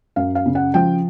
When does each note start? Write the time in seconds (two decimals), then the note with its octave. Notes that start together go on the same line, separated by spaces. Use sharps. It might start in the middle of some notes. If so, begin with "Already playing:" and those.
0.16 F#2 F5
0.35 F5
0.46 C#3
0.55 F#5
0.74 F3 G5